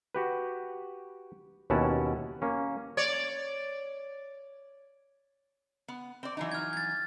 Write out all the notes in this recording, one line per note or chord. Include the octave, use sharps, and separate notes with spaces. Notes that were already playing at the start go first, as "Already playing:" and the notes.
F#4 G4 B4
D#2 B2 C#4 E4 F#5 A5
A#3 C#4
C#5 D5
B3
C4 D5
E3 F#3 D#4
F6 G#6
G#6 A6